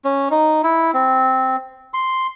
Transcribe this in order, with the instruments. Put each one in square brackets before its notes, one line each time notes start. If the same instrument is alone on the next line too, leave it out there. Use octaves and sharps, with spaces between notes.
[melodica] C#4
D#4
E4
C4
C6